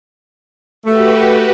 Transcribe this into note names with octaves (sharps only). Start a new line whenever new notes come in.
A3 F#4 G4 B4